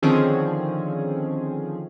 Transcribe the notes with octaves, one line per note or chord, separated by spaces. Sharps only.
D3 D#3 F3 C4 C#4 G#4